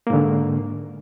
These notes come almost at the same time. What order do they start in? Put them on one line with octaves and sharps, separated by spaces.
A#3 G#2 D3